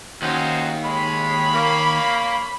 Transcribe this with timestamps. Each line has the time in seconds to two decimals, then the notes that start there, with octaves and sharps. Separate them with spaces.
0.22 D#2 C#4 D#4 F#4 C5
0.85 G#3 C#5 B5
1.54 A#3